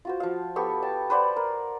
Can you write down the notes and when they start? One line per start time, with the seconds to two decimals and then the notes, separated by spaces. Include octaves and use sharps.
0.05 F4 F#4 C5
0.20 F3 F5
0.56 B3 G4 A4 C#6
0.82 G5 A5
1.10 B4 C5 D5 F#5
1.36 A#4